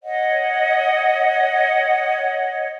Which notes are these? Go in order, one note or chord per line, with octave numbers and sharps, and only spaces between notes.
C#5 D#5 F#5